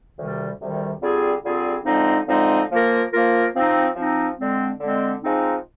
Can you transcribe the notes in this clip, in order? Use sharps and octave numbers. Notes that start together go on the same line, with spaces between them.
D2 C3 D#3 G3
D2 C3 D#3 G3
D3 G3 C4 F4 G#4
D3 G3 C4 F4 G#4
D3 F3 G#3 C4 D#4
D3 F3 G#3 C4 D#4
F3 A#3 F4 A#4
F3 A#3 F4 A#4
F3 C4 D#4
F3 C4 D#4
D3 G#3 C4
D3 G#3 C4
F3 G#3 C4 D#4